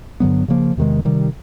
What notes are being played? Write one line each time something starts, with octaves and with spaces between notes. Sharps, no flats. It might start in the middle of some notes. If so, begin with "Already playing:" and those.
G2 D3 F#3 B3
C#3 F3 A#3
E2 C3 D#3 G#3
C3 D#3 G3